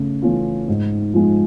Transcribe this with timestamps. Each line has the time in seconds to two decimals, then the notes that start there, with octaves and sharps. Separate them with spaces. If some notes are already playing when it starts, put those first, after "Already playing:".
Already playing: C#3 A3 C#4
0.22 E3 A3 C#4 F4
0.68 G#2
1.14 F3 G#3